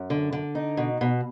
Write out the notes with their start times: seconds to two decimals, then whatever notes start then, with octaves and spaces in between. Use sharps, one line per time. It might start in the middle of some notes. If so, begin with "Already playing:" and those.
Already playing: F#2
0.10 D3
0.33 D3
0.55 D#4
0.77 B2
1.01 B2